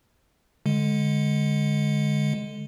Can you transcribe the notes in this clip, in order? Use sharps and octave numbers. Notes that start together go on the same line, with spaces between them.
D3 G#3